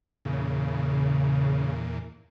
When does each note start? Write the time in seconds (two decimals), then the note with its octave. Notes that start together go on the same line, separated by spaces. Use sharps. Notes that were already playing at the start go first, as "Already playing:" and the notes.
0.25 E2 A#2 C#3